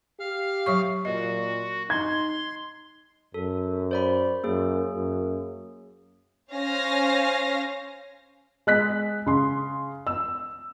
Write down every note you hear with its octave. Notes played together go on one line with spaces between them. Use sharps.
G4 F5 F6
F#3 C#5 C#6
A#2 F#4 D#5
D#4 C6 G#6
F#2 A4
C5 D5 B5
F#2 A#3 G#4
F#2
C#4 C5 F5 G#5 A#6
G#3 F#6 B6
C#3 C6
E6